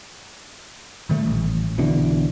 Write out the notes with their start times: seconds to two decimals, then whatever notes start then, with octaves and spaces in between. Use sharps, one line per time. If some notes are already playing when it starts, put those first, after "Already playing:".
1.09 A#2 D#3 G3 A3
1.26 A1
1.78 B1 B2 D3 E3